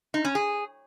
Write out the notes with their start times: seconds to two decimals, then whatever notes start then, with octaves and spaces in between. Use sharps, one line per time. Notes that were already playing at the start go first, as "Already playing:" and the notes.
0.14 D#4
0.25 C#4
0.35 G#4